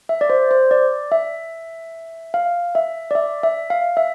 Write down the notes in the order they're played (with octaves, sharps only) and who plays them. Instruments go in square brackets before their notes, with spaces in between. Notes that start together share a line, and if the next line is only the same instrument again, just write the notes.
[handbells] E5
D5
C5
C5
D5
E5
F5
E5
D5
E5
E5
F5
E5